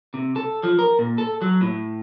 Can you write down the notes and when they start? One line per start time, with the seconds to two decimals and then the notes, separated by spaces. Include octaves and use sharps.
0.14 C3
0.36 A4
0.63 F3
0.79 A#4
0.99 A#2
1.18 A4
1.42 F#3
1.61 A2